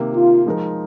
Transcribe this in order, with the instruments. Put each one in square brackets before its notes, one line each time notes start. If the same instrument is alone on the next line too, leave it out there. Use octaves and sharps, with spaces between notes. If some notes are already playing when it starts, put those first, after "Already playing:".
Already playing: [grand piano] C3 D#3 A#3
[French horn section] F4
[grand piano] F3 G#3 D#4 A#4